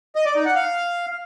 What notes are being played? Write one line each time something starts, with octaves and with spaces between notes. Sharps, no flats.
D#5
D5
D#4
F#5
F5